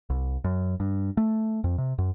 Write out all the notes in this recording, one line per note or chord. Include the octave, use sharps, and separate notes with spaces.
C2
F#2
G2
A3
F2
C3
F#2